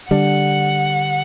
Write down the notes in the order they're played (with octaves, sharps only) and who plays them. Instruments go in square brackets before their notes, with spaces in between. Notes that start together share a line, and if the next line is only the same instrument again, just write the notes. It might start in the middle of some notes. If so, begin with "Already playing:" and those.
[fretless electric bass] D3 G3 D4 [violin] F#5